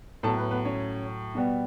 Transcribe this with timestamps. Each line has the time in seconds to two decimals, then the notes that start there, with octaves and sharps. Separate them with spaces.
0.23 A2 F#3 B3 A4 A5
0.37 B3 B4
0.51 B3 B4
0.65 C#4 C#5
1.35 B2 G3 B3